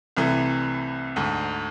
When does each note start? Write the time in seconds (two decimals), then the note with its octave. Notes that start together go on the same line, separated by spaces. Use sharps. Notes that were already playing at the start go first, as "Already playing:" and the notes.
0.17 C2 C3 E3 A3
1.16 D2 G#2